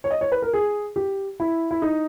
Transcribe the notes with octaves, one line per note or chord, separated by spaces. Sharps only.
C#5
D#5
C#5
B4
A#4
G#4
G4
E4
E4
D#4